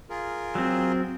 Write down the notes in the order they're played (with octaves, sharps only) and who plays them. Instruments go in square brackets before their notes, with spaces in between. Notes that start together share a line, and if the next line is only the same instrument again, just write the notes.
[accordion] F4 G#4 A#4
[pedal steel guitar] F#3 C4